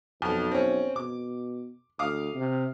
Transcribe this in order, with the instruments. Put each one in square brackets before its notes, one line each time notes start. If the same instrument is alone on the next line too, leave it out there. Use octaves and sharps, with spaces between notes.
[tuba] B1 [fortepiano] F2
[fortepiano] C4 C#4
[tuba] B2 [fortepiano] D6
[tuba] D2 [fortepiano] F5 D6 D#6
[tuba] C3